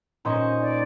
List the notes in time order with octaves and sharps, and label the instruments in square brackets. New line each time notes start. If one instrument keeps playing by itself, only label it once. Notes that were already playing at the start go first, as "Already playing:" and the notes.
[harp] A#2 C#4 C#6 [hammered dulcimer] D#4 C5 D#5
[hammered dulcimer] D#4 [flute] D5